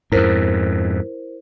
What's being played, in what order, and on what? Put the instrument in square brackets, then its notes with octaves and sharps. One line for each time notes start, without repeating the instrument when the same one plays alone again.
[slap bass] F2 G#2 [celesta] E4 A#4 C5